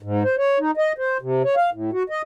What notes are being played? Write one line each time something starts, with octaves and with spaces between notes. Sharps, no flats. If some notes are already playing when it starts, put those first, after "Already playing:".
G#2
C5
C#5
D#4
D#5
C5
C3
C#5
F5
A2
F#4
D#5